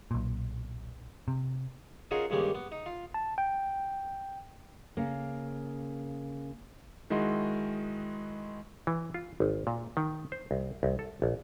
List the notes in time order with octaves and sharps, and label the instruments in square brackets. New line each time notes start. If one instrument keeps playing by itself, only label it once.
[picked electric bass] B1 A#2
C3
[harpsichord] C#4 D#4 F4 F#4 G#4 A#4
G2 D#3 G#3 A#3 C#4 G4
B3
D#4
F4
[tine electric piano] A5
G5
[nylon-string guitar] C#3 A#3
[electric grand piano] D#3 G#3 E4 F#4 D#5 C6
[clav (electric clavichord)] E3
F4
G#1
A#2
D#3
C5
C2
C2
A4
A#1